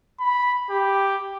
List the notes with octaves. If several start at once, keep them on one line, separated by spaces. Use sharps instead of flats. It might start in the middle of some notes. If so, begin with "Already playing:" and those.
B5
G4